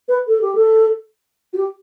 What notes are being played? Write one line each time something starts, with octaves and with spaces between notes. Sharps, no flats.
B4
A4
G4
A4
F#4
G4